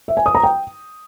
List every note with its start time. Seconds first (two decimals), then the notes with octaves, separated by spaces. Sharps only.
0.08 E5
0.17 G#5
0.26 D#6
0.35 A#5
0.43 G5